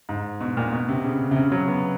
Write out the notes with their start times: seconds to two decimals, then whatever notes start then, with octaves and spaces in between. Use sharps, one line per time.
0.09 G#2
0.40 B2
0.57 A#2
0.72 B2
0.89 C3
1.05 C#3
1.31 C3
1.36 C#3
1.52 F#3
1.68 B3